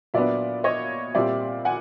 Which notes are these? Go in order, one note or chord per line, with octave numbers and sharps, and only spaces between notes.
A#2 F#3 B3 D4 D5 E5
C#5 D#5
A#2 G3 C4 D5 E5
F#5 G#5